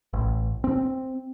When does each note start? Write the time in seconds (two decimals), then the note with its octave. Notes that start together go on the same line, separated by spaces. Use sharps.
0.13 A1
0.64 C4